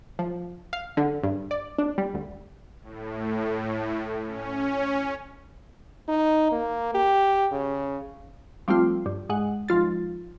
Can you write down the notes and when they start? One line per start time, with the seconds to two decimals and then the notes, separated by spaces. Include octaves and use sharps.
0.19 F3
0.73 F5
0.97 D3
1.23 G2
1.51 D5
1.78 D4
1.98 G3
2.14 D2
2.81 A2
4.24 C#4
6.08 D#4
6.52 A#3
6.94 G4
7.52 C#3
8.68 F3 G3 A3 C4 F4
9.06 G2
9.29 G#2 G#3 F#5
9.68 G#1 F3 F4 A6